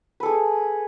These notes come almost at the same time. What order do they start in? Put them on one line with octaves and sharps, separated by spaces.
B4 A4 G#4